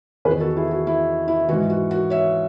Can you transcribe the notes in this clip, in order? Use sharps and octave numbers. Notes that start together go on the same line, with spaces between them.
E2 D#3 G#4 B4
F#4 A4
E4 G#4
F#4
E4
E4
G#2 E3 F#4
F#4
F#4
C#5 E5